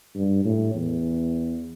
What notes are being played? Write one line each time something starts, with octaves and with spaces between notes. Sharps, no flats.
G2
A2
E2